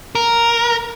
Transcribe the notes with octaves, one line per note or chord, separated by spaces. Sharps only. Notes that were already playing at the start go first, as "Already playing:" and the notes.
A#4